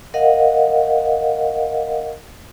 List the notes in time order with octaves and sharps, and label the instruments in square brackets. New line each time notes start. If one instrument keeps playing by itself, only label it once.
[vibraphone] A#4 D#5 F5 F#5